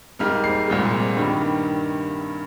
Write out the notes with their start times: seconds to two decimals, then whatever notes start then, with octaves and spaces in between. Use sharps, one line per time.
0.19 G#2 G3 A#3 F6
0.44 C7
0.67 C2 A#2 F3 G#3
1.16 G2 D#3 G3 A#3